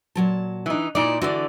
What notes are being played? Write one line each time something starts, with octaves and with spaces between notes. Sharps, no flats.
A#2 F#3 A5
E3 D#4
A#2 D#4 E4 D5
D3 E3 F#4 D5